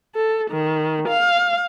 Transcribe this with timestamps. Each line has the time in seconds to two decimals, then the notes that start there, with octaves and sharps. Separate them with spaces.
0.15 A4
0.51 D#3
1.09 F5